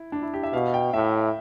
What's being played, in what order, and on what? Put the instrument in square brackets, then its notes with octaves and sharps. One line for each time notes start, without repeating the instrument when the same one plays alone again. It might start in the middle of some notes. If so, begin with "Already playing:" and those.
Already playing: [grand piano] E4
D4
E4
G4
E5
[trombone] B2 [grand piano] F5
[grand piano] G5
[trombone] A2 [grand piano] E5